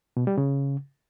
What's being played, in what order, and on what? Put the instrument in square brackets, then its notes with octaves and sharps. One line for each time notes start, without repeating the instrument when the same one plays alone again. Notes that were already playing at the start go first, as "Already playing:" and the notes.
[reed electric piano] B2
G3
C#3